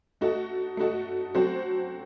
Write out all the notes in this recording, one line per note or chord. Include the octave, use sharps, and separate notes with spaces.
A3 D#4 F#4 A4
A3 D#4 F#4 A4
F#3 C4 F#4 A4 C5